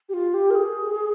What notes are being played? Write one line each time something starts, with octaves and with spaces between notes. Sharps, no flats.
G4
F4
G4
A#4
G#4